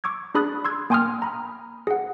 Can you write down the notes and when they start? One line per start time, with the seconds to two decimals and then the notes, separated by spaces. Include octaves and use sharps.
0.04 C#6 D6 E6 G#6
0.35 D4 G#4 B5 D#6 F#6 A6
0.65 C6 E6 G#6
0.90 A#3 G5 G#5 C6 D#6 F6
1.22 A#5 B5
1.87 G#4 F#5